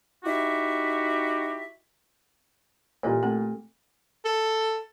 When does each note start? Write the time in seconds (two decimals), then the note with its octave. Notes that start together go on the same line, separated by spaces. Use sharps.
0.24 D#4 E4 F#4 G4 E5
3.03 A#2 E3 G4 A4 D#5
3.23 A3 C4 A4
4.25 A4